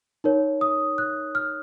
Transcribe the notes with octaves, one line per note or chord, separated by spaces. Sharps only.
D#4 A#4 C#5
D#6
F#6
F6